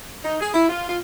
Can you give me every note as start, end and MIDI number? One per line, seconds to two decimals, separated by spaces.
0.23 0.36 63
0.40 0.53 68
0.54 0.66 64
0.69 0.88 65
0.89 0.98 65